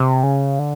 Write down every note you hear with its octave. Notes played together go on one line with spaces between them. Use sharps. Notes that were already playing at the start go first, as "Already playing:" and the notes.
Already playing: C3
C#3
D3